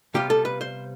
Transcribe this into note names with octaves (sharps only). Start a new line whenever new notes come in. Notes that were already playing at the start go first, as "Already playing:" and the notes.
C3 G3 B3 F4 G4
A4
B4
C5